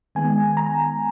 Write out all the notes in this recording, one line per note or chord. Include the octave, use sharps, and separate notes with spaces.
D#3 G#3 B3 G#5
A#5